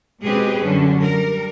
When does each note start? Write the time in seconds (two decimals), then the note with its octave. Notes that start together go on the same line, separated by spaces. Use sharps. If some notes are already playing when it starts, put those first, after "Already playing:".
0.22 B2 G#3 C4 G4 G#4 B4
0.62 F#2 D3 G3 C#4
1.02 G3 A#4